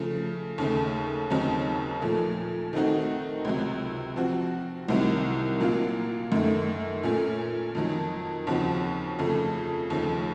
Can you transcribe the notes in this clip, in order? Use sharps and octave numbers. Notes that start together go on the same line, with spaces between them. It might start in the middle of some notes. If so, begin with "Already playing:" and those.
Already playing: C#3 F3 A3
D#2 C#3 A3
D#2 C#3 F#3 C4 D#4
A#2 F3 A3
D#3 A3 C4 D#4 F#4
C#2 C3 F#3
F3 C4 F#4
C2 C3 D#3 F#3
A#2 F#3 A#3 F4
F#2 D#3 A3
A#2 A3 C#4
F2 D#3 F#3
D#2 C#3 F3 C4 F#4
F2 C#3 A3
D#2 C#3 F3 A3